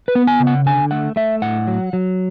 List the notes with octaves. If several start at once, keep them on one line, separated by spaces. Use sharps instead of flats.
B4
B3
G#5
C#3
F#5
D3 G#5
A3 F#5
A3 E5
A2 F#5
F#3
F#3